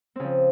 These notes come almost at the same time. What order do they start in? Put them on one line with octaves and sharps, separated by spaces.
C4 C#3 F3